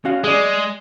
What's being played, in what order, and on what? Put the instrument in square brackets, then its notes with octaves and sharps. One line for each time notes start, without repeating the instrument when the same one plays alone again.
[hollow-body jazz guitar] C#4 F#4 F5
[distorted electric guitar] G#3 [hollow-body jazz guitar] G#4 D5